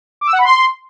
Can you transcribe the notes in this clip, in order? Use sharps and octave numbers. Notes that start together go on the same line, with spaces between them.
D6
E6
F#5
B5
C6